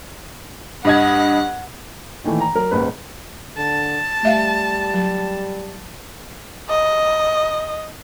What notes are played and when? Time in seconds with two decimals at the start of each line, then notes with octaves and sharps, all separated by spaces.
0.85 G2 D#5 F#5 G#6
2.24 A#2 D#3 E3 A3
2.40 A#5
2.55 F#3 A#4
2.71 D#1 C#2 G#2 B4
3.57 D3 A5
4.23 G3 A3 E5 F5
4.94 F#3
6.70 D#5